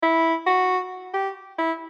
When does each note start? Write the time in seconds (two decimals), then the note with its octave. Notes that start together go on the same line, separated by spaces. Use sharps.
0.03 E4
0.47 F#4
1.14 G4
1.58 E4